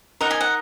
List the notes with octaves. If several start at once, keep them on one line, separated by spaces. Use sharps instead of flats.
D#4 A#4 D#5 F#5
G#5
F#5